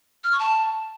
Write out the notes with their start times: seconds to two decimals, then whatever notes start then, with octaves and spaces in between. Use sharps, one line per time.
0.24 F6
0.32 C#6
0.39 A5